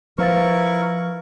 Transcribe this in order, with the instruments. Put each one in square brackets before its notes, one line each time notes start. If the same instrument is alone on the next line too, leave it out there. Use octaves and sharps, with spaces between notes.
[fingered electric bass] F3 [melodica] E4 A#4 C#6 [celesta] B4 F5 A6